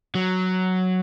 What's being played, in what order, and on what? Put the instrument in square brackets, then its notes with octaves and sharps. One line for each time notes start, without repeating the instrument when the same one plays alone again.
[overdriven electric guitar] F#3